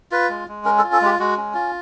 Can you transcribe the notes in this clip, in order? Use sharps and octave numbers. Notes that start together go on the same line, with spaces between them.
F4 B4
G#3
G#3
C#4 A#4
A4
F4
A4
G#3 G4
G#3 F#4
C#4
F4